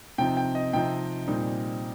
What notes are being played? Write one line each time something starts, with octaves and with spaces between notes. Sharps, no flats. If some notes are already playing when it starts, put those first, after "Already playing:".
C3 F3 C4 D#4 G5
G5
D#5
C3 F3 C4 D#4 G5
A#2 G3 C4 D#4